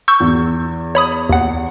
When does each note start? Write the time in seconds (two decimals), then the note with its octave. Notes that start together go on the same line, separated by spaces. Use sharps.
0.08 C#6 E6 G6
0.20 E2
0.95 C#5 B5 D#6
1.29 D#2 F#5